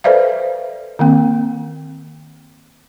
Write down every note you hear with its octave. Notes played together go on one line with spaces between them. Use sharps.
A4 B4 C5 D5 E5 F5
D#3 A#3 C4